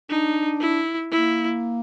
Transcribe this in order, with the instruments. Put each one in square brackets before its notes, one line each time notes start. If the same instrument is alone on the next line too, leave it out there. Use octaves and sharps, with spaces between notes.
[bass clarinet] D4 [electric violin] D#4
[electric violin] E4
[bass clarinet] A#3 [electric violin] E4